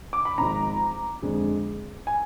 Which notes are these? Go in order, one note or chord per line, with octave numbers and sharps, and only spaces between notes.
D6
B5
G#1 G#2 F3 A#5
F2 D3 G#3
G#5